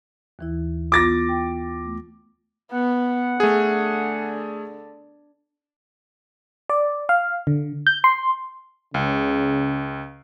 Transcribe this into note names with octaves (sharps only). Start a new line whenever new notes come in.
D#2 E3 E4
B3 F4 D6 A6 A#6
G5
A3
B3 F#5
D3 A3 G#4
D5
F5
D3
G6
C6
C#2 C#3